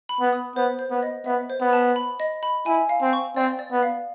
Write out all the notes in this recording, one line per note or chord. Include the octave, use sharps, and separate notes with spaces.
B5
B3
D#6
B3 C5
C5
B3
D#5
B3 E5
C5
B3
A5
B5
D#5
B5
E4 G#5
F5
C4
C#6
C4 D5
D5
B3
F5